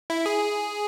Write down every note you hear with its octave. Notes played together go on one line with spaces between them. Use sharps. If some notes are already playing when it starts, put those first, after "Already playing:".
E4
G#4